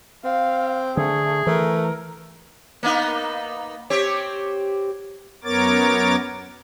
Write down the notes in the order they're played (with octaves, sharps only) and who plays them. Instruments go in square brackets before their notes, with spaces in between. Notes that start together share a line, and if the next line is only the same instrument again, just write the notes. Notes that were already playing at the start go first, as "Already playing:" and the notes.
[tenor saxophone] C4 [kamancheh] F5
[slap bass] D3 [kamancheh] A3 [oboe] G#4
[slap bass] E3 [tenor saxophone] A3 [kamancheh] A#4
[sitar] A#3 B3 D#4
C4 G4 C#5
[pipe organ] F#2 B3 A#4 C#5 D6 A6